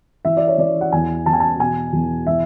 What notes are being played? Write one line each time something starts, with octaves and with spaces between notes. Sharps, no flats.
E3 E5
D5
C#5
E3 D5
F#5
E2 G#5
E2 A5
G#5
A5
B2 G#5
E2
E3 E5